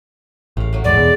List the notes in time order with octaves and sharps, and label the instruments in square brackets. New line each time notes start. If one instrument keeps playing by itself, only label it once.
[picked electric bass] A1 [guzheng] A2 F5
[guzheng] A2 F#3
[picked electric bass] A#1 E2 G#2 [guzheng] G#3 [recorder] D5
[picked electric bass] E2 B2